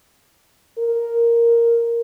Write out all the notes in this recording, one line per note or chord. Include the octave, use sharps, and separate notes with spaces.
A#4